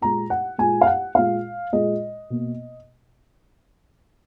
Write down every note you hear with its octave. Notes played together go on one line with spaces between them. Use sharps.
A#2 G#3 A#5
F#5
A#2 G#3 G#5
F5
F#5
A#2 G#3 F5
A#2 G#3 D#5
B2 A#3